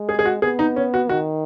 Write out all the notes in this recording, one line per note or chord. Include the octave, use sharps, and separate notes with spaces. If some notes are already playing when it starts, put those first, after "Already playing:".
Already playing: G#3
G#4
G#4
F#4
B3 G#4
D#4
C#4
F#4
D#3 F#4